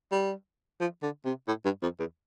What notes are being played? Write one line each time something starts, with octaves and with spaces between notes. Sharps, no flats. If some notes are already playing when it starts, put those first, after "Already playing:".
G3
F3
D3
C3
A2
G2
F2
E2